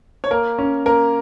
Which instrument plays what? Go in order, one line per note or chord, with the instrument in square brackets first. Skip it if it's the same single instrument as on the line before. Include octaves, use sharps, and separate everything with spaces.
[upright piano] C#5
[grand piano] A#3 [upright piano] A#4
[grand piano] C#4
[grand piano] A#3 [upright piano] A#4